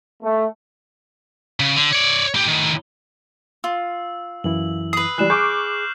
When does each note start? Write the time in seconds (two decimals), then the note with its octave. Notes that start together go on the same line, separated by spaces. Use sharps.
0.22 A3
1.60 C#3
1.76 D3
1.93 C#5 D5
2.35 A2 G4
2.47 A2 D#3
3.64 F4 E6
4.44 F#2 E3 E4 F#7
4.93 B4 D#6 C7 F#7
5.18 E3 G3 F#6 E7
5.30 G#4 C#6 D6 F6 G6